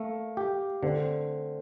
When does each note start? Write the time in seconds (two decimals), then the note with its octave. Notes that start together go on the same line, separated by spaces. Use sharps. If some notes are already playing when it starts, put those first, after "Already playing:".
Already playing: A3 A#3
0.37 G4
0.83 D3 A3 C4